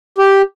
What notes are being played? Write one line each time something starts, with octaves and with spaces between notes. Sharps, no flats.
G4